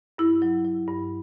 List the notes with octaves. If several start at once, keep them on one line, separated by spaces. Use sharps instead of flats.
G2 E4
F#3
F#3
G2